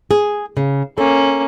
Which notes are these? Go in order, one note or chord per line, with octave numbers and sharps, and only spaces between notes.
G#4
C#3
A#3 C#4 A4